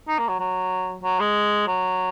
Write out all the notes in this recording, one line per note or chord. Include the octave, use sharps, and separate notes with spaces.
D#4
A#3
F#3
F#3
F#3
G#3
F#3